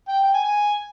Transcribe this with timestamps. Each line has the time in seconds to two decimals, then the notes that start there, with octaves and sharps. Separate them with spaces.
0.09 G5
0.24 G5
0.34 G#5
0.44 G#5